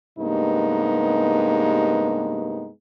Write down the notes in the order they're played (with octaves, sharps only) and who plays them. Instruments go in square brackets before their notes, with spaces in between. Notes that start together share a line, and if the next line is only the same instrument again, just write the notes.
[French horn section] G2 C3 G#3 A#3 B3 D#4